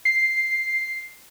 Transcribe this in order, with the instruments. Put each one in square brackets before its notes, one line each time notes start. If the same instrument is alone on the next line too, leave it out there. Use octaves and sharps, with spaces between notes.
[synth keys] C7